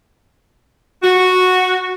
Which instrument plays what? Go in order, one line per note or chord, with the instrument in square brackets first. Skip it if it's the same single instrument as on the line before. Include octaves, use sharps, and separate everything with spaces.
[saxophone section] F#4